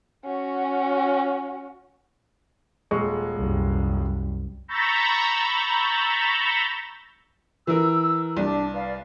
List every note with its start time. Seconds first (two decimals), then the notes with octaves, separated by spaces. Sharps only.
0.24 C#4 F#4
2.91 D#1 G#3 C#6
3.36 C2 F#2
4.68 A#5 B5 C#6 E6 G6 A6
7.67 E3 A#4 E6
8.37 C2 D4
8.73 B4 D5 F5